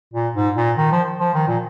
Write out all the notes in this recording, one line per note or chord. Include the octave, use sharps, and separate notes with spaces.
A#2
G#2
A#2
D#3
F3
F3
D#3
A#2